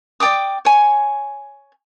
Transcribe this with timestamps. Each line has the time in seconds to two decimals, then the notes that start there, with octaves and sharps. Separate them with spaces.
0.20 D5 G5 D6 D#6
0.65 C#5 G#5